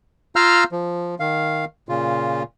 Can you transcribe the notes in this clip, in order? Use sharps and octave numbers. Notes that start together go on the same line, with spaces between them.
F4 F5 A#5 E6 F6 G6
F3
D#3 F5
A#2 C#3 F4